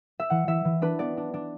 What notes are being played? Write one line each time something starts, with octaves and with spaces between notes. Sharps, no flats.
E5
E3 F#5
E3 E5
E3
D4 B4
B3 D5
D4
D4